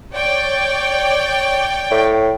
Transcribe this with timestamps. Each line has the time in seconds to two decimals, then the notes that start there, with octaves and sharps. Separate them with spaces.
0.13 C#5 D5 G5
1.91 A2